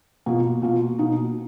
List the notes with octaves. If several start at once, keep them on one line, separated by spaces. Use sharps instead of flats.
B2 A#3 F4
B2 A#3 F4
B2 A#3 D#4